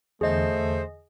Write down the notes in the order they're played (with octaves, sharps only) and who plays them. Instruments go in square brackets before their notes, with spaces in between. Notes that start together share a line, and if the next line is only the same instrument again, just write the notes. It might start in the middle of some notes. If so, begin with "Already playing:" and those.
[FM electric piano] E2 D3 [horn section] A3 C5 [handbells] G#4 D#5